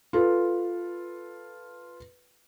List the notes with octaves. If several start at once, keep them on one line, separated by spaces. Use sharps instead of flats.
F4 A4 B4